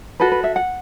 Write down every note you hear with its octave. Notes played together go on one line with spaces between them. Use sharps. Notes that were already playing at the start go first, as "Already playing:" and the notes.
F#4 A4 B4
B4
E5
F#5